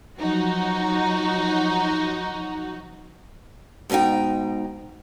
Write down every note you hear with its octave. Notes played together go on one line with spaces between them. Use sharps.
F3 F#3 D#4 F#4
G#2 B2 F3 D#4 G5